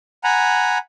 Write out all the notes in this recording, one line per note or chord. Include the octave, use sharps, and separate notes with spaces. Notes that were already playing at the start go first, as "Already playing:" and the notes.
F#5 G#5 A#5 B5